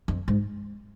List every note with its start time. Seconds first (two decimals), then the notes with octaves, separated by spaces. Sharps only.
0.08 F2
0.28 G#2